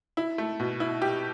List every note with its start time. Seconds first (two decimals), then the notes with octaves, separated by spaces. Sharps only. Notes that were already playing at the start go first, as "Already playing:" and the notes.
0.17 E4
0.38 A3
0.60 B2
0.80 E4
1.02 G4